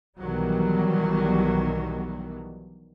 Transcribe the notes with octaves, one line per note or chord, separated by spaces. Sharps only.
B1 B2 D#3 E3 F#3 G3